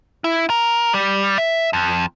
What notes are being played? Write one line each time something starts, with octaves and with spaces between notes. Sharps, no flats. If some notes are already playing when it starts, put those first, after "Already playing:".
E4
A#4
G3
E5
F2